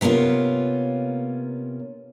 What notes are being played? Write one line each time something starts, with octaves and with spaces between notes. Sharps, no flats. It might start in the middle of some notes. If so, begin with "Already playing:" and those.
C3 A#3 B3 C#4 F4